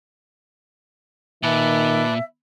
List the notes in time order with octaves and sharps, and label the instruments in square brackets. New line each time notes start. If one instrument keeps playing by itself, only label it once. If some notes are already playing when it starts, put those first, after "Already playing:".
[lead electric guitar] A#2 [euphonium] D#3 [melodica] B4 A5 D6 [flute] E5